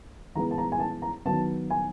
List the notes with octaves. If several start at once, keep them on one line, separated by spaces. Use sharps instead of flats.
E3 G#3 B3 A#5
A5
A#5
G#5
A5
A#5
D#3 F#3 B3 A5
G#5